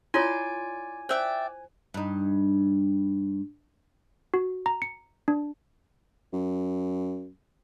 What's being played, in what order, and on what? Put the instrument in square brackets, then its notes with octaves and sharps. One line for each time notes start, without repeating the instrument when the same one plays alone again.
[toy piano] E4 F4 C#5 [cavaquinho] D5 C6 [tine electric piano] G#5
[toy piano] C5 [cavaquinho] D5 E5 G5
[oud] G2 D#4
[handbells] F#4
A#5
C#7
D4
[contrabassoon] F#2